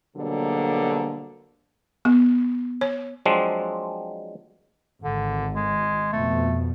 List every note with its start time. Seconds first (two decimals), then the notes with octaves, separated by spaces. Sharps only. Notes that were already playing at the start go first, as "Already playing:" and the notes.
0.16 G#2 B2 D3 F#3 G3 A#3
2.05 B3
2.81 C#5
3.25 F3 F#3 G#3 C4 D4
5.04 G#1 D3
5.55 G#3
6.13 F2 B2 A3